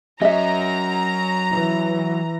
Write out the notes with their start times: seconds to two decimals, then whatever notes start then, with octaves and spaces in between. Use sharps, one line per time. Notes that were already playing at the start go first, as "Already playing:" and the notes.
0.21 F#3 C#4 D#5 E5 A#5
1.51 E3